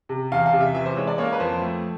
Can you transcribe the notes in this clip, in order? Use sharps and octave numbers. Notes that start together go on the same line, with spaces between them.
C3
E2 F5
F5
C3
E5
E3 E5
C5
G#3 C#5
D5
A#3 C#5
B4
F2 C5
A3